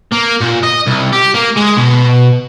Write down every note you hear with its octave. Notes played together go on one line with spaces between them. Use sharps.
A#3
A#2
D#5
C2
G4
A#3
G#3
B2